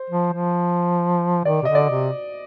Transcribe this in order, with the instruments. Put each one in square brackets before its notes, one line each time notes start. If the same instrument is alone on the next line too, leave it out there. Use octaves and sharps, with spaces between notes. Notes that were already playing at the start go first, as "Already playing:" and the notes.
Already playing: [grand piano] C5
[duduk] F3
F3
[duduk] D#3 [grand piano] D5
[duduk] C3
[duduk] D3 [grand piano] D#5
[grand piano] D5
[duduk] C3